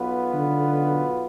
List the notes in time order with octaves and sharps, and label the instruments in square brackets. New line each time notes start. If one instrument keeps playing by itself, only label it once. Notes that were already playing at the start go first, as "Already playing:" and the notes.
Already playing: [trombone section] B1 B2 B3 F4 B4
[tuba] D3